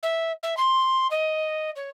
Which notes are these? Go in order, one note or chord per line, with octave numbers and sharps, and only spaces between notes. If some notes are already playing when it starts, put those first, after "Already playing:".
E5
E5
C6
D#5
C#5